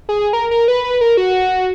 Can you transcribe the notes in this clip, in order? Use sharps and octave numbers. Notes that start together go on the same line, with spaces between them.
G#4
A#4
A#4
B4
B4
A#4
F#4